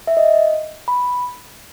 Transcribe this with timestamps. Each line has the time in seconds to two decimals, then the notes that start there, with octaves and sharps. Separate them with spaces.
0.07 E5
0.17 D#5
0.88 B5